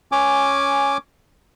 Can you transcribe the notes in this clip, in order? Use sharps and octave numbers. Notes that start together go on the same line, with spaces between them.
C#4 G#5 D6